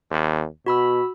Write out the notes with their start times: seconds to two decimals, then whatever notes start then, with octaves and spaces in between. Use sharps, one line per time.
0.11 D#2
0.66 B2 F#4 B5 E6